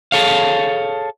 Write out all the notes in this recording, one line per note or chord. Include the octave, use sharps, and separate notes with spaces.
G#4 A4 C#5 F5